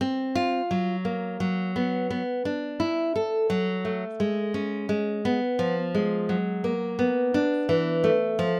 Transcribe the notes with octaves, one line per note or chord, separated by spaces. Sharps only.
C4
F4
F#3
A#3
F#3
B3
B3
D4
E4
A4
F#3
A3
G#3
C#4
G#3
B3
F3
G#3
F#3
A#3
B3
D4
E3
A3
F3